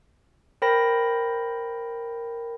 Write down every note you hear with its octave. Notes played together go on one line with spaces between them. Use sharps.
A#4 C5 G5 B5 A#6